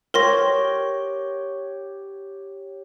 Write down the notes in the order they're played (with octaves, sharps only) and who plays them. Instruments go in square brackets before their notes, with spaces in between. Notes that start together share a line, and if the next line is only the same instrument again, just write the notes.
[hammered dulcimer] G4 C#5 G5 [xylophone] A#4 C6 A#6